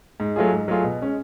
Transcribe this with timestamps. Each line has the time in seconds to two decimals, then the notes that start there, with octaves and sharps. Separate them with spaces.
0.20 G#2
0.36 F#3 A3 F4 G#4
0.52 G#2
0.68 F#3 A3 F4 G#4
0.84 B2
1.01 G#3 C#4